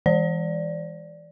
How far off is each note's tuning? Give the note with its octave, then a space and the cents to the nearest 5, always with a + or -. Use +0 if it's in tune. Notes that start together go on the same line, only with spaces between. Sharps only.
E3 +0 D5 +0